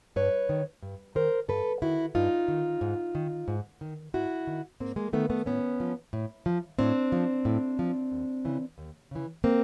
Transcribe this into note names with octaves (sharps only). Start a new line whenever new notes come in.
G2 B4 C#5
D#3
G2
D#3 A#4 C5
G2 A4 B4
D#3 E4 F#4
G2 D#4 F4
D#3
G#2
D#3
G#2
D#3
G#2 E4 F#4
D#3
G#2 A#3 C4
G#3 A#3
D#3 A3 B3
A3 B3
A2 B3 C#4
F3
A2
F3
A2 C4 D4
F3
A2
F3
D#2
C#3 E3
D#2
C#3 E3
A#3 C4